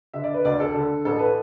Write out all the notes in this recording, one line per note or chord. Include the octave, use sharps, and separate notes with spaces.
D3 E5
D5
B4
D2 D5
A4
D3
A1 A4
B4